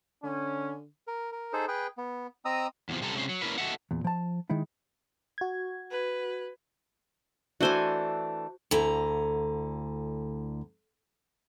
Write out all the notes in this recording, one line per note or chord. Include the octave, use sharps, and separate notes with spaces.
D3 C#4
A#4
A#4
D#4 G#4 A4 C5
G#4 B4 G5
B3
C4 D#5 A#5 D#6 E6
E2 C3 F3
C3 G3 C4 A4 A#5
C3 G#3 C4 C#4 C5
F#3
A#3 C#4 D4 E4 A#4 B4
F#4 A4 D#5 E5 F#5
E2 A#2
F3 A5
D#3 G#3 D#4 E4
F#4 G#6
B4
E3 A3 D4 F#4 C5 G#5
D2 D3 E4 A#5